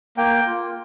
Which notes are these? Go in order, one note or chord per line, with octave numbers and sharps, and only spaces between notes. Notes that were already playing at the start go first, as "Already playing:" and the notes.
A#3 G5
F4